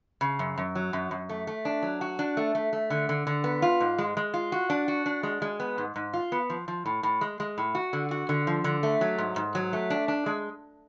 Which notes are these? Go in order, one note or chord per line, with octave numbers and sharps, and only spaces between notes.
C#3
F#2
F#2
F#3
F#2
F#2
A3
A3
D4
F#3
F#4
D4
A3
A3
A3
D3
D3
D3
B3
F4
G#2
G#3
G#3
F4
F#4
D4
F#4
D4
G#3
G#3
B3
G#2
G#2
F4
B3
F3
F3
A2
A2
G#3
G#3
A2
F#4
D3
F#4
D3
F3
D3
A3
F#3
G#2
G#2
F#3
A3
D4
D4
G#3